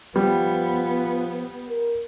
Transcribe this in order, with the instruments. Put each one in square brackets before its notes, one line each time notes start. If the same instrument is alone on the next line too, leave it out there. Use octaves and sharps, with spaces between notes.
[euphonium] F3 [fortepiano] G3 [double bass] B3
[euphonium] A#4